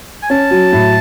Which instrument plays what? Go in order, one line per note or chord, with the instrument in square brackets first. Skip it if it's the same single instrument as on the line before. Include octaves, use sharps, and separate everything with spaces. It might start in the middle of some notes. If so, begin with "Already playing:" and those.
[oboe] G#5
[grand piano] C#4 [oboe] A5
[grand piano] F#3
A2